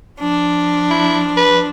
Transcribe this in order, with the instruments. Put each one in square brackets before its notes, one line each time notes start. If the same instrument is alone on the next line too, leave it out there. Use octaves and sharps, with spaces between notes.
[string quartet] F3 D4
[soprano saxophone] E4
B4